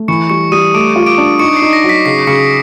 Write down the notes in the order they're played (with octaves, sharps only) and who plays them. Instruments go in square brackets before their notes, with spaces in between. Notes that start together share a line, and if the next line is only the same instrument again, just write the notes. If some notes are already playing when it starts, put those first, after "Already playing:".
Already playing: [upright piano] A3
[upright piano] E3 [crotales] C#6 C#7
[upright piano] G3 [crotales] C#6 C#7
[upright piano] G3 [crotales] D#6 D#7
[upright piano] A3 [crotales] D6 D7
[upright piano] F4
[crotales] D6 D7
[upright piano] D4
[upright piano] D#4 [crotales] C#6 C#7
[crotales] C7
[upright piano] D#4
[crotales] A#6
[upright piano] F#3
[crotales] B6
[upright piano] C#3 [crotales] C7
[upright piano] C#3 [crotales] C#6 C#7